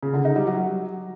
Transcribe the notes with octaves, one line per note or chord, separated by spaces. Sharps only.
C#3
D3
D#4
G3
F#3